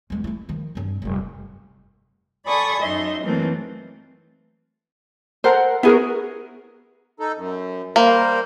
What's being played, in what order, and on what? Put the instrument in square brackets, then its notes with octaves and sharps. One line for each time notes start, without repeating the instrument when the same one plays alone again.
[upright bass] E2 G#3
A3 E4
D#3 F3
G2 C4
F1 G3
[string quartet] A4 D5 G#5 B5 C#6 D#6
F#2 D#4 E5 C6
E3 F#3 A3 A#3 C4
[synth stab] A4 A#4 F#5 [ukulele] C5
[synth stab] B3 F#4 A#4 [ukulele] E4 G#4
[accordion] D#4 A4
F#2
[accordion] G3 A#4 C5 [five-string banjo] A#3